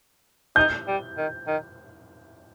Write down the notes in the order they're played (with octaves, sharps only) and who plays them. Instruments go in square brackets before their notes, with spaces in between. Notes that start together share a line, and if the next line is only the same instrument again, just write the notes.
[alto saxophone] D#4 [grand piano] G6
[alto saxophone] G3
D#3
D#3